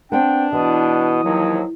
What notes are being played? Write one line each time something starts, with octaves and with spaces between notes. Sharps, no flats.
B3 C4 D4 G5
B2 E3 D#6
D#2 F3 F#3